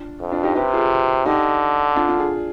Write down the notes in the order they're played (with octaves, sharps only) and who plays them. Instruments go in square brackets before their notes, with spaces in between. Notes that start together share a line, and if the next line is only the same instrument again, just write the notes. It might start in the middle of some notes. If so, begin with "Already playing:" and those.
Already playing: [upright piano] D4 F4
[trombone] F2
[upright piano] D4 F4
D#4 G4
[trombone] C3 [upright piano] G4 B4
[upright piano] F4 G#4
[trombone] D3 [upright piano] D#4 G4
[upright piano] D4 F4
D4 F4
F4 G#4